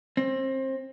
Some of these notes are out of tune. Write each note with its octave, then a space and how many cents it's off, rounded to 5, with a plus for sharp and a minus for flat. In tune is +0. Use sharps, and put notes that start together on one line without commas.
C4 +25